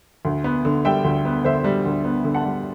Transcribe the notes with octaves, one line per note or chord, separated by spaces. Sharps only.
D2
B3
D3
G3 E5 G5
D2
B3
D3 C5 E5
G3
D2
B3
D3
F#5 A5
G3